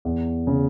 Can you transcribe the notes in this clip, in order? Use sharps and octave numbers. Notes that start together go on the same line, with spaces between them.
E2
C#3